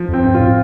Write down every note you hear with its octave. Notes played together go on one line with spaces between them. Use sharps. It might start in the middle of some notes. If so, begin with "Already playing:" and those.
Already playing: F3
F2
C4
G2
F4
A2